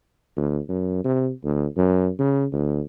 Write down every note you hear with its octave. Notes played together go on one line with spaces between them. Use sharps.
D2
F#2
C3
D2
F#2
C#3
D2